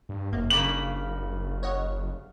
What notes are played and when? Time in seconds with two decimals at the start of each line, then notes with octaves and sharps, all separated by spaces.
0.09 G2
0.32 F#1 F#2 A#3
0.50 G2 C#3 A#3 D6 B6 F#7
1.63 C#5 D#5 F#5